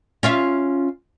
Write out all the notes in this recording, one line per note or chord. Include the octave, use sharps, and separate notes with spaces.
C#4 F4 E5